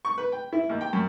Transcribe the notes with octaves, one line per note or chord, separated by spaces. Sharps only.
C#6
B4
G5
E4
D#2
G5
F#2